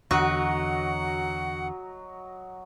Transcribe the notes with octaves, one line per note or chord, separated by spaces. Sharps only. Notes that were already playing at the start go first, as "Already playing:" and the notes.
E2 D3 F#3 F#4 D#5 F#5